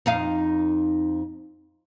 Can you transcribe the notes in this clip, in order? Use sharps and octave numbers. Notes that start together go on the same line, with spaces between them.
F2 D#4 F5